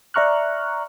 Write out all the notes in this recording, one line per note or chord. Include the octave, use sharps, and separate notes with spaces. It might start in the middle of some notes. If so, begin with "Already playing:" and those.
D5 E5 A#5 C#6 F6 F#6